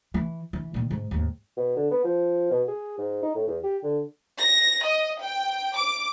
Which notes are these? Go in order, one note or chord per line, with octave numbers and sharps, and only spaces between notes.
E3
E3
A#2 D#3
G#2
D#2 G#2
B2
D3
B3
F3
B2
G#4
G#2
D#4
A2
E2
G4
D3
A#6
D#5
G5
D6